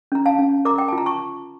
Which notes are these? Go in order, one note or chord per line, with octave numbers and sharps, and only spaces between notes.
C#4 A#5
F5 A5
C#4
A#4 A#5 D6
G5
A5
F4
A#5
A5 C#6